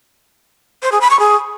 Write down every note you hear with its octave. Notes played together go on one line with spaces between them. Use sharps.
C5
G#4
B5
C#6
G#4